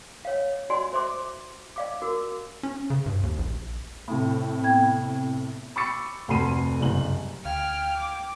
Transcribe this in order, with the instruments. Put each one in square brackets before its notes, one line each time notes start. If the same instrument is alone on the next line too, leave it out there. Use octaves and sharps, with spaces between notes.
[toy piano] C#5 F5
F#4 D5 G#5 C6
C5 E5 C6 D6
D5 F5 D6
F#4 A#4 D6
[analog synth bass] C#4
C#3
G2
D#2
A#1
[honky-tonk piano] A2 C3
[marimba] B3 G5 G#6
[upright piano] B5 C#6 D6 E6 A6 C#7
F1 D2 A5 B5 C7 D#7
F#1 C2 G2 F#7
[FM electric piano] D2 F5 G#6 [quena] G5 [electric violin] F6
[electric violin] D6